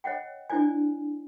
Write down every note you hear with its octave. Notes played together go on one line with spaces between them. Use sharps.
C#5 D#5 F#5 G5
D4 E4 C5 D5 G#5